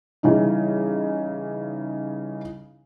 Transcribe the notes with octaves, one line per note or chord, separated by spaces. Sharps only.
C#3 E3 G3 D#4